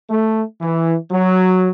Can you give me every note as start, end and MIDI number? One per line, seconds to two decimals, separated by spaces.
0.10 0.43 57
0.61 0.95 52
1.11 1.71 54